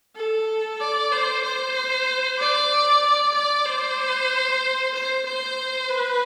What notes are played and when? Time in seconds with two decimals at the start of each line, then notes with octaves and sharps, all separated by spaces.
0.16 A4
0.80 D5
1.12 C5
1.43 C5
2.39 D5
3.34 D5
3.66 C5
4.94 C5
5.25 C5
5.89 B4